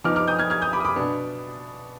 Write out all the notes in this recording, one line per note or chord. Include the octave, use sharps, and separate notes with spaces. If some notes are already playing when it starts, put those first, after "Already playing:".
F3 B3 D#4 D6 F6
D6 F6
D#6 G6
F6 G#6
F6 G#6
D#6 G6
B5 D6
D#6
B5 D6
B2 B3 D4